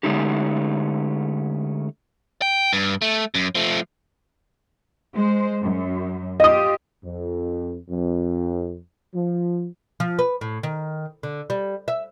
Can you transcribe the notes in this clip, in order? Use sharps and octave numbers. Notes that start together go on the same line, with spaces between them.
D3 G#3 A3 C#4 D#4 G4
G5
G2
A3
F#2
F3 A3
G#3 C5
F#2
F4 G4 D#5 D#6
F2
F2
F3
F3
B4
A2
D#3
D3
G3
E5